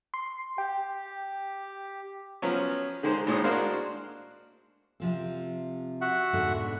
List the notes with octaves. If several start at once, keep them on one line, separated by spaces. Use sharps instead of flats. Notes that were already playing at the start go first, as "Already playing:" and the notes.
C6
G4 G5
F3 F#3 B3 C#4
D3 D#3 G#3 C5
G#1 A2 G#3 D#4 D#6
G#3 A#3 D4 F#4 C5 F5
C3 F3 C4
F#4 E5 F#5
G#2 B2 D3